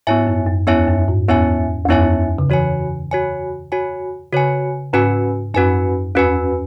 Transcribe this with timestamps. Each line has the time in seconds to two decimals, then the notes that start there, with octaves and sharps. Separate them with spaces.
0.07 G#2 B3 E4 C#5 E5 G#5
0.27 F#2
0.47 F#2
0.67 E2 B3 E4 C#5 E5 G#5
0.88 F#2
1.08 G#2
1.29 E2 B3 E4 C#5 E5 G#5
1.85 E2
1.89 F#2 B3 E4 C#5 E5 G#5
2.39 C#3
2.50 E3 F#4 C#5 G#5
3.11 F#4 C#5 G#5
3.72 F#4 C#5 G#5
4.33 C#3 F#4 C#5 G#5
4.93 G#2 C#4 F#4 B4 G#5
5.54 F#2 C#4 F#4 B4 G#5
6.15 E2 C#4 F#4 B4 G#5